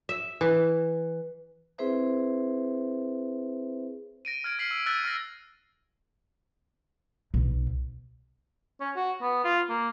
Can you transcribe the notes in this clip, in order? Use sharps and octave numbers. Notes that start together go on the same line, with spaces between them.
E5
E3
C4 E4 G#4 B4 C5 E5
A#6 D7 D#7
F6 G#6 D7
F6 B6 C7 F#7
E6
E6 F#6 A6 B6 D7 D#7
F6 A#6
B1
C#4
F#4
B3
F4
A#3